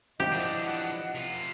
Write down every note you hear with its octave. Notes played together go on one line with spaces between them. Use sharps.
F3 G4 D#5 F#5
E3 D4
C3 F4